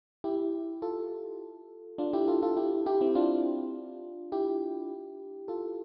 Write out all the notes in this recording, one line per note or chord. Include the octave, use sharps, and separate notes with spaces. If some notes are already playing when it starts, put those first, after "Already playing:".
E4 G4
F4 A4
D4 F4
E4 G4
F4 A4
F4 A4
E4 G4
E4 G4
C4 E4
D4 F4
E4 G4
F4 A4